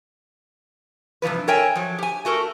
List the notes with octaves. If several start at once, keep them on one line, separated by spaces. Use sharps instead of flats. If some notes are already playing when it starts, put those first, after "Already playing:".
G2 C3 E3 F3 B4
A4 A#4 C#5 E5 G5 G#5
F3 F#3
G4 G#5
A3 F#4 A4 A#4